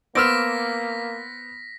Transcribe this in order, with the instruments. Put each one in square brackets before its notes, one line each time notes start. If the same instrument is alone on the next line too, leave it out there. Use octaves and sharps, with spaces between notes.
[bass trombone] A#3 [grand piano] B3 C5 [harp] D6 E6 F6 [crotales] A#6 B6